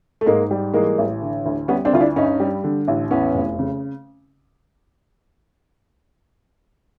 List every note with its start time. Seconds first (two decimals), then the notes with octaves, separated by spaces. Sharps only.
0.21 A3
0.26 G#2 G#3 A#3
0.51 G3
0.74 E3 G#3 A#3
0.98 A1
1.22 D3
1.46 D2
1.68 G3 B3 C#4
1.85 C4 D4
1.93 D2 F4
2.00 D4 E4
2.16 G2 C#4 D#4
2.40 G3
2.64 D3
2.88 A1
3.11 E2 B3 C#4
3.34 F1
3.59 C#3